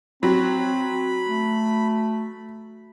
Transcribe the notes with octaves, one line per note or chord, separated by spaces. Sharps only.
F#3 C4 B5
A3